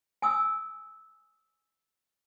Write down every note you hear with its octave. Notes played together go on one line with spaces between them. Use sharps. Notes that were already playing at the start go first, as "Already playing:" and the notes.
G#5 D#6 E6